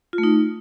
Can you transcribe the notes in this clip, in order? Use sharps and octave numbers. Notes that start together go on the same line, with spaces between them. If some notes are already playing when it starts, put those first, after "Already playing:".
F4
A3
D#4